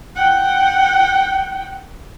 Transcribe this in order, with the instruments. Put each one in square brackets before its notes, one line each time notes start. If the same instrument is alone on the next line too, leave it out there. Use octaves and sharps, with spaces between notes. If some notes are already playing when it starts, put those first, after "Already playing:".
[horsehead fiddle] F#5 G5